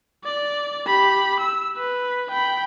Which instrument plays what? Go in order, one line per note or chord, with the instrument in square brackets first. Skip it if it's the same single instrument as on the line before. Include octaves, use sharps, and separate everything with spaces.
[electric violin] D5
G4 B5
E6
B4
G5 B5